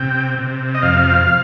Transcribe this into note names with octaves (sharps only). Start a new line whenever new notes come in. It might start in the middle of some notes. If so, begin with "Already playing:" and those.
Already playing: C3 G5
C3
D#5
F2 F5